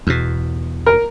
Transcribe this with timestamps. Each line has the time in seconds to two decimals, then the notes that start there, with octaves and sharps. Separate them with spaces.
0.07 E2 B2
0.86 A#4